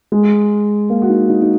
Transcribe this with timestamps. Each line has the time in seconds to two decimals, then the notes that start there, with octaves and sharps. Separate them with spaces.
0.12 G#3
0.90 A#3
1.02 F#4
1.09 D#4
1.29 D#4
1.42 D#4